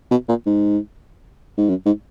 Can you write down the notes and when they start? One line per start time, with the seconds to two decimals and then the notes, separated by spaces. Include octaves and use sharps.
0.11 B2
0.28 A#2
0.46 G#2
1.58 G#2
1.69 F#2
1.86 G#2